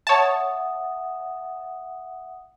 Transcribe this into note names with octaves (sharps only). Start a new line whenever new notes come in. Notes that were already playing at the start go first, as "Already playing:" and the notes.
C#5 E5 F#5 A5 D#6